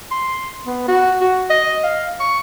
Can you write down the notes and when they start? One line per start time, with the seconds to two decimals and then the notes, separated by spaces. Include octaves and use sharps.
0.11 C6
0.67 B3
0.88 F#4
1.21 F#4
1.50 D#5
1.84 F5
2.20 C#6